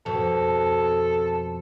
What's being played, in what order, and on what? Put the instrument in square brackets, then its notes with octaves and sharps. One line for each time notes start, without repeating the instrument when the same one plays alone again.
[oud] F2 B2 [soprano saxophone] A4